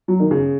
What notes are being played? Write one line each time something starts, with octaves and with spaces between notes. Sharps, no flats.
F#3
D#3
C#3